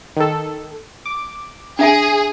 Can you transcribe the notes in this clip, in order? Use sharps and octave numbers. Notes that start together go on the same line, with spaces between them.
D#3 A4
D6
D4 G#4 E5 G#5